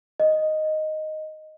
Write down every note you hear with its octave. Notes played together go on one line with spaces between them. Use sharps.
D#5